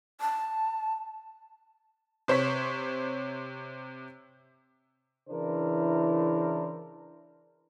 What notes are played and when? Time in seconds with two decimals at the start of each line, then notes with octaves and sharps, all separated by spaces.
0.21 A5
2.28 C3 C5 C#5 B6
5.30 C#3 E3 D4 E4 A#4 C5